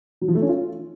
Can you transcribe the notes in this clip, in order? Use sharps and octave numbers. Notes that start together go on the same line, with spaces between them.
F#3
F3
A3
C#4
F4